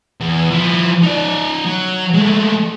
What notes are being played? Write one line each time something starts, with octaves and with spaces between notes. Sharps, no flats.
E2
F3 E4
D#4 D5
F#3
G#3 A3